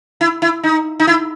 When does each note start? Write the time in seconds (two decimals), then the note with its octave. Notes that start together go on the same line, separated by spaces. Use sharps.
0.21 E4
0.42 E4
0.63 D#4
1.00 D#4
1.07 E4